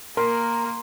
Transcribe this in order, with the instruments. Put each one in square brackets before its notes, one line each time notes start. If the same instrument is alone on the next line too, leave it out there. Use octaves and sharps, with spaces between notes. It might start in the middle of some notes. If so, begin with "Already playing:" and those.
[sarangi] A#3 [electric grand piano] A#4 [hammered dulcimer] C6